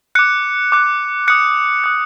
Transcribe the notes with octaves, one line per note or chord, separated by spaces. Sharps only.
D6 F#6 C#7
D6 F#6
D#6 F#6 C#7
D#6 F#6